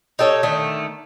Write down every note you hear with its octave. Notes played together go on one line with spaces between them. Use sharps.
D#4 G4 A4 C#5
D3 D#3 A3